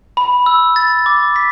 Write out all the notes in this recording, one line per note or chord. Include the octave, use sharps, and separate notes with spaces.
B5
E6
A6
D6
B6